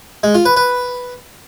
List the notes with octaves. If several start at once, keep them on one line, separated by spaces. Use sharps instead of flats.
G#3
F4
B4
B4